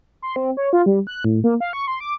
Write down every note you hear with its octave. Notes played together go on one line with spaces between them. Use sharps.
C6
C4
C#5
F4
G3
F#6
A2
A#3
F5
C#6
C6
D6